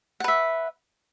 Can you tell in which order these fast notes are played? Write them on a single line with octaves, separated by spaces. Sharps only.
F#5 B4 E5